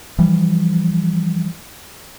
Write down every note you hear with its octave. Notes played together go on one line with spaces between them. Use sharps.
E3 F3 G3